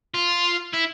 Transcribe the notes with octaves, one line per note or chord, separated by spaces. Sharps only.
F4
E4